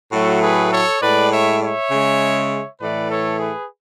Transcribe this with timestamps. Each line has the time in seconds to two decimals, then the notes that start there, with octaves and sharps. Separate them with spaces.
0.11 A2 F#3 A3 F#4 A4
0.41 G#4 B4
0.72 A4 C#5
1.02 A2 G#3 B4 D5
1.31 C#5 E5
1.61 C#5 E5
1.91 C#3 G#3
2.80 A2 E3 A3 B4 D5
3.10 A4 C#5
3.39 G#4 B4